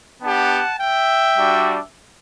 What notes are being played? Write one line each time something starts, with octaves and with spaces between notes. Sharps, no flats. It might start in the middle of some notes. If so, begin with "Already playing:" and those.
B3 D4 G4 F#5 A5
E5 G5
G3 D4 F#4